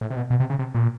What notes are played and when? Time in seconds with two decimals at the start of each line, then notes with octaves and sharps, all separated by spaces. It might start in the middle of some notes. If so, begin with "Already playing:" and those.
0.01 A2
0.10 C3
0.16 B2
0.30 B2
0.40 C3
0.50 C#3
0.59 C3
0.74 A#2